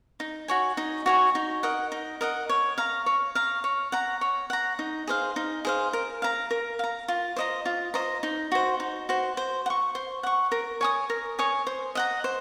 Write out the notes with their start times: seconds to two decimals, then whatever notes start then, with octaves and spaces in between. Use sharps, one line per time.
0.20 D#4
0.48 F#4 C#5 G#5
0.77 D#4
1.06 F#4 C#5 G#5
1.35 D#4
1.63 A#4 D#5 F#5
1.92 D#4
2.21 A#4 D#5 F#5
2.49 C#5
2.78 F5 A#5
3.06 C#5
3.35 F5 A#5
3.64 C#5
3.92 F#5 A#5
4.21 C#5
4.50 F#5 A#5
4.79 D#4
5.07 G#4 C5 F5
5.36 D#4
5.65 G#4 C5 F5
5.93 A#4
6.22 F5 A#5
6.51 A#4
6.79 F5 A#5
7.08 F4
7.36 C5 D#5 A#5
7.66 F4
7.94 C5 D#5 A#5
8.23 D#4
8.52 F#4 C5
8.80 D#4
9.09 F#4 C5
9.37 C5
9.66 F#5
9.70 C#6
9.95 C5
10.23 F#5 C#6
10.52 A#4
10.81 C#5 G#5 D#6
11.10 A#4
11.39 C#5 G#5 D#6
11.67 C5
11.95 D#5 F#5 A#5
12.24 C5